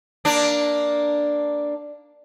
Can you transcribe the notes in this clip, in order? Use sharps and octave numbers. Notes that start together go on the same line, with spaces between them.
A#3 D4